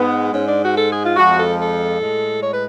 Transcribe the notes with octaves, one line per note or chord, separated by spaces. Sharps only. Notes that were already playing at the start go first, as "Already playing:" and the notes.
Already playing: G#2 G#3 B3
G#2 G#3 C#4
D4
F#4
A4
G#4
F4
F2 F3 G#3 F#4
A4
A4
A2 G#3
C#5
B4